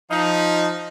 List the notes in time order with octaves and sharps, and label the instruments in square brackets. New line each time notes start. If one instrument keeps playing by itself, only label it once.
[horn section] F3 D#4